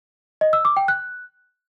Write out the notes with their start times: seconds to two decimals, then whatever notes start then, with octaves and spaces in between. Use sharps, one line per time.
0.41 D#5
0.53 E6
0.65 D6
0.77 G5
0.88 F#6